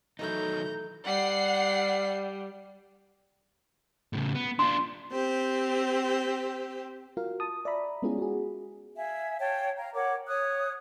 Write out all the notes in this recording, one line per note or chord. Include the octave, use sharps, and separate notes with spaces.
D#3 E3 F#3 A3 D#4 E4 A#5 G6
G3 F#5 C7
A2 C#3
B3
D4 F4 C6
C4 G4 C5
F4 F#4 A#4 F5
A5 D#6
D5 E5 A#5 B5
G#3 B3 C#4 E4 F4 G#4
F#4 G#4
E5 F5 G#5
C#5 F5 G5 A5
F5 A#5
A#4 C#5 F#5 D6
C#5 D#6 F#6